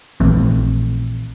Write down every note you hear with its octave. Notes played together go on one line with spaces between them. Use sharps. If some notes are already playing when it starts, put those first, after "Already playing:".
A#1 E3 A3 C4